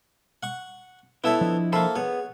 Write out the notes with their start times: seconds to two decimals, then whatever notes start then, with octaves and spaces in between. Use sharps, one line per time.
0.43 F#5 C#6
1.24 B3 E4 A4 C#5 E5
1.41 F3 D4 D#5
1.73 A#3 A4 C5 E5 B5
1.96 B3 G#4 C#5